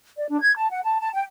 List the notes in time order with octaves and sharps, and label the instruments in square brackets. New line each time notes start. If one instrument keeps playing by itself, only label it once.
[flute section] D5
D4
G#6
A5
F#5
A5
A5
G5